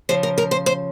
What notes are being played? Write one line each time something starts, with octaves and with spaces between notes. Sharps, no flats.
C#3 F3 C5
A#4
A#4
C5
C5